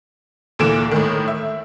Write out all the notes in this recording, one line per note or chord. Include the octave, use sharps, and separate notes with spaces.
D2 A#2 D3 E3 D7 E7
A2 D#3
E5